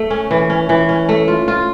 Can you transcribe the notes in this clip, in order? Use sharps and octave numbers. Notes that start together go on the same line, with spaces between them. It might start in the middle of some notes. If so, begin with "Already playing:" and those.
Already playing: A3
C#4
E3
C#4
E3
C#4
A3
F4
F4